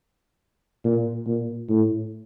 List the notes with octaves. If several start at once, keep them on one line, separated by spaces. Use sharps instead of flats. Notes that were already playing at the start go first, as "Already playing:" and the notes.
A#2
A#2
A2